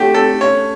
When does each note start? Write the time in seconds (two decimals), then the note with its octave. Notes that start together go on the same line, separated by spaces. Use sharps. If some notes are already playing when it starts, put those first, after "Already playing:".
Already playing: A3 F#4 G4
0.14 A3 A4
0.41 C#4 C#5